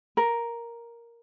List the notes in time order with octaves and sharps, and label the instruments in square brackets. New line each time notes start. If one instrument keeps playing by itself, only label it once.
[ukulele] A#4